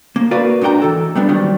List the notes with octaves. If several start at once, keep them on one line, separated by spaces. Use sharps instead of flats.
A#3
F#4 A#4 B4 D5 F5
G#2 D4 F#4 G5 A#5
E3 A4
G3 B3 D4
G#2 D#3 F#3 G3